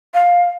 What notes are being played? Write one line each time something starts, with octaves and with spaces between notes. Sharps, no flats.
F5